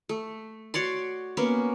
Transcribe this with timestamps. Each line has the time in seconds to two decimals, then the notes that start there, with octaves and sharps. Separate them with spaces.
0.09 A3
0.74 F#4 C#5 D5 C6
1.37 A#3 B3 C#4